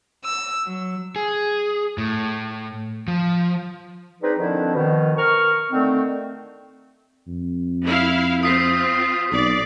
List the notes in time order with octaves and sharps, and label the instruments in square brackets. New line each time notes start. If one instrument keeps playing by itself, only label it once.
[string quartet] E6
F#3
[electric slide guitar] G#4
A2
F3
[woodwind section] C4 D4 D#4 G#4 B4
D3 D#3 F3 C4 D4 E4
B2 D#3 F3
A#4 C#6 F6
D3 D#3 A3 C4
[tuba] F2
[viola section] E4 F5
[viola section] C4 F4 [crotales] D#6 B6 C7
[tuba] B1 [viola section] D5